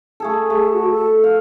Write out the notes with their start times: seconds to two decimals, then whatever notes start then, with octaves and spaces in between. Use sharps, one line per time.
0.20 A3 G#4 A4
0.50 A3 G#4
0.74 F#4
0.92 A4
1.24 F5